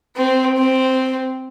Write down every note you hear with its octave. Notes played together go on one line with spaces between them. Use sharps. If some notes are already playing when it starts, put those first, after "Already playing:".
C4
C4